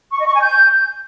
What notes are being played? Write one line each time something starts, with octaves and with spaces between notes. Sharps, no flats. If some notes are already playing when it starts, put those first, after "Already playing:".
C#6
D#5
C#6
G#5
G6